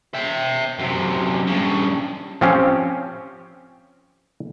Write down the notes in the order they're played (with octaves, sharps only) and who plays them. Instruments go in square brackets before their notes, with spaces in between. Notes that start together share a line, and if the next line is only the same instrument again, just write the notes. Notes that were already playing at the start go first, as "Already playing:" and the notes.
[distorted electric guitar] E5 G5
F#2 C3
G2 C#3
[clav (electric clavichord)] F3 C4 C#4 G4